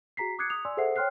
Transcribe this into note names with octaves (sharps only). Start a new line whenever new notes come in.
F#4 G#4 A#5 B6 C7
D6 D#6 F#6 G#6 C7 C#7
D#6 F7
D5 G#5 C6 E6
G#4 A4 C5 E5 F#5 C7
C#5 G5 C6 F6 F#6 C7